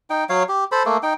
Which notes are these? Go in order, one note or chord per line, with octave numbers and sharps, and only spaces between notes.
D#4 G5
F#3 C#5 F5
G4
A4 C5 B5
A3 A#3
D#4 G5